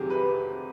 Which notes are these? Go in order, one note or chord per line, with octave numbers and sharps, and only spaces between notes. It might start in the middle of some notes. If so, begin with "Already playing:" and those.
Already playing: F2 C3 D#3 F#3 G4 G#4
B4